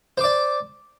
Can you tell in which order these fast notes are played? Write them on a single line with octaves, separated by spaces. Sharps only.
C5 D6 D5